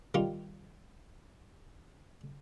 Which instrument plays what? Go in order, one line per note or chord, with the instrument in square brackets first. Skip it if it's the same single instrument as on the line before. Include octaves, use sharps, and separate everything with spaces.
[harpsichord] D#3 G3 F4